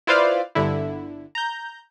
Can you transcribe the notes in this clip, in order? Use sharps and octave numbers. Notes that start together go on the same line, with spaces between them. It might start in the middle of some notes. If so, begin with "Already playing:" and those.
E4 F4 B4 C5 D5 F5
G1 D3 E4
A#5 G6